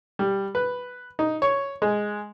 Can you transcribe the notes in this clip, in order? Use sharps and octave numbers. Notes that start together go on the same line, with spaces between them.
G3
B4
D#4
C#5
G#3